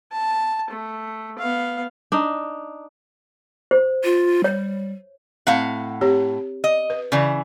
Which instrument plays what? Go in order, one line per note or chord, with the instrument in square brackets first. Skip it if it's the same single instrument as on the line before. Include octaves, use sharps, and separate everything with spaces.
[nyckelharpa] A5
A3
B3 F5
[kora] D4 D#4
[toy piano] C5
[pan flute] F4
[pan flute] G3 [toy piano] C#5
[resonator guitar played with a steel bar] A2 F5 F#5 [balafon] C4
[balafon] C4 G4 C#5
[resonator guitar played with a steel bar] D#5
[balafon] B4
[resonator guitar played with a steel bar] C#3 E3 [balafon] D5 B5